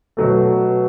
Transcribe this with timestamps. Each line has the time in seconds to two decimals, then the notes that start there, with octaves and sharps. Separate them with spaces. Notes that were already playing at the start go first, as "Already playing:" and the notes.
0.17 B2 F#3 A3